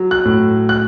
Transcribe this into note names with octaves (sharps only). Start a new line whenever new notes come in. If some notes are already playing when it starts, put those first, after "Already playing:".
Already playing: F#3
F#6
A2
F#6